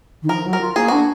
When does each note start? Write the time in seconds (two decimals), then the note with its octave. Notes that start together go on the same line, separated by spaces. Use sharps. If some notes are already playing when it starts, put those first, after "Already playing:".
0.22 D#3
0.29 F3 A#4
0.45 F#3
0.53 A#4
0.61 F4
0.76 A#3 G#4
0.88 D4 F#4